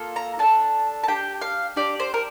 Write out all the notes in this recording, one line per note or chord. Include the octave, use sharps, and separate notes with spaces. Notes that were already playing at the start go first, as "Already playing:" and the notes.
Already playing: A#3 F4 A4
A#5
D4 A4 A5
A5
D4 G4 G5
F5
D4 G4 D5
C5
A#4